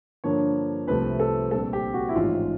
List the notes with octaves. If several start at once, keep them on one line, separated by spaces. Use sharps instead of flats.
G2 D3 F3 A#3 C#5
C2 C3 F3 A3 C4 B4
A4
A#1 A#2 G3 C4 A4
G4
F#4
E4
A1 G#2 F3 F4